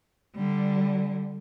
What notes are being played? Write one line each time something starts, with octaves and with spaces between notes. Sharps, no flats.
D3 G3